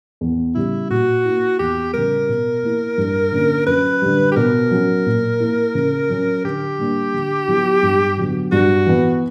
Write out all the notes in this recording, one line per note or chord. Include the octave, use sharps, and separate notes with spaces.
E2
C#3 G3 E4
A#2 F#4
A#3 E4
E2 G4
C#3 G3 A#4
B2
A#3 E4
G2
D3 A#3 C#4
F#2 B4
D3 G3
G4
B2 A#4
F#3 C#4
A#2
A#3 E4
C#3
F#3 C#4
D3 G4
G3 A#3 D4
D3
F#3 B3 E4
G2
D3 F#3 B3
G2 F#4
E3 B3